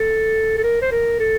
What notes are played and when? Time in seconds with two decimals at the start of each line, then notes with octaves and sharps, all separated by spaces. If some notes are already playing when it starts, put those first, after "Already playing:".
Already playing: A4
0.58 A4
0.63 A#4
0.82 C5
0.91 A#4
1.20 A4